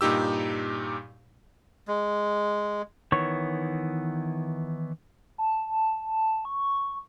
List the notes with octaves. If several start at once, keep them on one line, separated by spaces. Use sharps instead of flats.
G2 A#2 D#4 G4 E6
G#3
D#3 E3 B3 C#5 C#6
A5
C#6